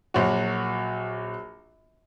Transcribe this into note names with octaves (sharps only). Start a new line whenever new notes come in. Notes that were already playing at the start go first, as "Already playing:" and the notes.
A#1 F#3 F#4